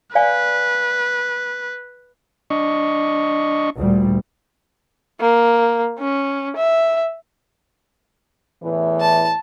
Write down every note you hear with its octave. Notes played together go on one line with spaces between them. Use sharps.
B4 D5 F5 G#5
D4 D#5 C#6
D2 A#2 G3
A#3
C#4
E5
E2 A2 E3
A5